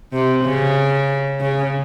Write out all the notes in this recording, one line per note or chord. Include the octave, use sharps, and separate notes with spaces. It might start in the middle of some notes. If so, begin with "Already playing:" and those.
C3
C#3
C#3